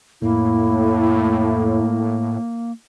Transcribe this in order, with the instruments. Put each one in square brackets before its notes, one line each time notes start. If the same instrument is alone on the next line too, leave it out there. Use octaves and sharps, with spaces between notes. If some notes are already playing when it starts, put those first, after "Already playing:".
[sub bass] F2 [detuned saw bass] A2 [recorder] A#3 [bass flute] E4